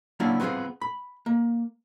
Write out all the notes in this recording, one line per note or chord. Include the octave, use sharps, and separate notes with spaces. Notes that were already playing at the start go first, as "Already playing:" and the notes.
F#3 A#3 C#4 D4 E4 F4
B3 C4 D#4 F4 G#4
B5
A#3